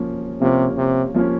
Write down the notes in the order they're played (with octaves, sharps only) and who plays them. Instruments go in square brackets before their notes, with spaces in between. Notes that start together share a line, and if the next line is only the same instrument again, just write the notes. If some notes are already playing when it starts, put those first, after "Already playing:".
Already playing: [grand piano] F3 A#3 C#4
[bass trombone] C3 [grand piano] F3 A#3 C#4
[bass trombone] C3
[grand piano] F3 A#3 C#4